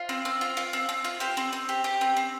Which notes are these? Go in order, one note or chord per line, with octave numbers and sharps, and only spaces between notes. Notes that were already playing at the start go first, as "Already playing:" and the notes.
Already playing: F4 C5
C4
C4
F4
F4
C4
C4
F4
G4 C5
C4
C4
G4
G4
C4
C4